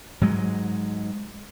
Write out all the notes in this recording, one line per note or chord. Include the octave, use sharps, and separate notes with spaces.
G#2 F#3 G#3